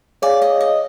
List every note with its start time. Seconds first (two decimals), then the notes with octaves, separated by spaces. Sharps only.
0.22 G#4 C#5 D5 F5 G#5
0.42 D#5
0.61 D#5